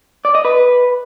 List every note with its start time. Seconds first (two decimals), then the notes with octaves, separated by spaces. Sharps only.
0.25 D5
0.35 D#5
0.45 B4